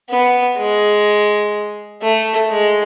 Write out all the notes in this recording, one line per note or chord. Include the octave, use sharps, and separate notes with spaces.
B3
G#3
A3
G#3